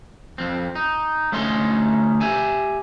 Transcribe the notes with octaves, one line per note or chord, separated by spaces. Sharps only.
F2 C4
D#4
D2 A3 C#4 D#4 C6
G4 E5 G#5